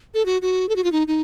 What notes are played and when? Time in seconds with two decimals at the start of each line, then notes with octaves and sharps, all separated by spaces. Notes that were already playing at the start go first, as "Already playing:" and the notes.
0.14 A4
0.26 F#4
0.42 F#4
0.69 A4
0.76 F#4
0.84 F4
0.92 D#4
1.08 D#4